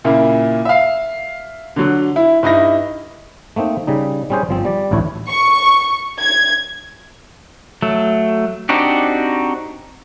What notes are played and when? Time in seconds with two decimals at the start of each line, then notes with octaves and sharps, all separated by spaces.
0.05 A#2 C#3 A#3 E4
0.65 E5 F5
1.76 D3 F#3
2.16 E4
2.43 G2 D#4 E4 A#6
3.56 A3 A#3 C4 D#4
3.87 C#3 G3 D#4
4.30 G3 C4 C#4 G#4 C5
4.49 G1 F3 C4
4.65 G3 D5
4.91 A1 D2 A2 E4 C#5
5.29 C#6
6.19 G#6
7.82 F#3 A3
8.69 C4 D4 D#4 F#4 G4